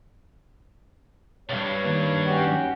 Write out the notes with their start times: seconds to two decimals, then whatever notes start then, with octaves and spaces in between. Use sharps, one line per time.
1.49 B1 G2 C#5
1.83 D#3 A#3 B4
2.27 C#4 F#4 G4